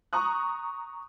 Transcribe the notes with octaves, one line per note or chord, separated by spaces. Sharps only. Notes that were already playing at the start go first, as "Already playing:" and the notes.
A#5 C#6 D#6 F#6